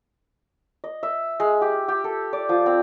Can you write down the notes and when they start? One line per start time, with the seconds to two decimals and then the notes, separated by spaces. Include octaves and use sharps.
0.84 D#5
1.03 E5
1.40 G#3
1.61 G4
1.88 G4
2.04 A4
2.33 D5
2.49 F3
2.66 C4